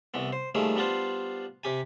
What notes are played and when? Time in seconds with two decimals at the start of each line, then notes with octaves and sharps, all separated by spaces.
0.14 C2 E3 B3
0.33 C5
0.55 D#3 F3 G3 A3 A#3 G#4
0.76 G3 B3 D4 F4 C5
1.63 C3 G4 G#5